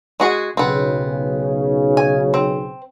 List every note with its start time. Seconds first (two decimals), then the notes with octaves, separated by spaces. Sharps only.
0.20 G#3 F#4 G#4
0.57 B1 C#3 B3 C4
1.97 G#5
2.34 C4